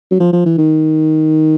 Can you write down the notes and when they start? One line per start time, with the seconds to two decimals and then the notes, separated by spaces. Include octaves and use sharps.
0.11 F#3
0.20 F3
0.33 F3
0.45 E3
0.58 D#3